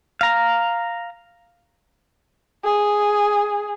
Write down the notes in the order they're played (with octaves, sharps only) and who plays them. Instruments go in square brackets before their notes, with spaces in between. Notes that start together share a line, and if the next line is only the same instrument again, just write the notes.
[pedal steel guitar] F5 A#5
[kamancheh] G#4